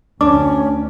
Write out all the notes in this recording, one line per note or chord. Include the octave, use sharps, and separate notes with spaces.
D2 C#4 D4 D6